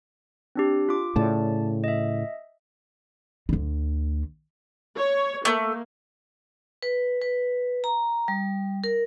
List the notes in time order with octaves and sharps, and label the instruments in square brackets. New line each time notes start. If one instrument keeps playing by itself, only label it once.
[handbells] C4 D4 G4
F4 D6
[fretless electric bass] A2 C#3 [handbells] D5 A5
[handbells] D#5 E5
[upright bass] D2 D3
[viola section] C#5
[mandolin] A3 [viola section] A#3
[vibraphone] B4
B4
A#5
G3
A#4